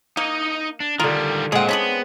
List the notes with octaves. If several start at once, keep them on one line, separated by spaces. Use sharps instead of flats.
A#3 D#4 D#5
D4
D3 D#3 G3 F4 A#4
A#2 G#3 C4 G#4 F#5
B3 C#4 D4 G#4